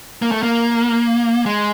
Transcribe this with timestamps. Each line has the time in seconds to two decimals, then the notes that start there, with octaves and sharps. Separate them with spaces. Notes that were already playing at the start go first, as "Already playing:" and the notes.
0.22 A#3
0.32 A3
0.43 A#3
1.46 G#3